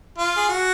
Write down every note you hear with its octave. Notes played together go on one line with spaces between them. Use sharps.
F4
G#4
F#4